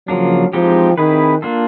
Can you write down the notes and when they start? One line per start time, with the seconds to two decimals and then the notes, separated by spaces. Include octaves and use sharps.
0.08 C#3 F3 F#3 A#3 D4
0.53 E3 F3 G#3 C4 D#4 G4
0.98 D#3 C4 E4 G#4 B4
1.42 A#3 D4 F4 A4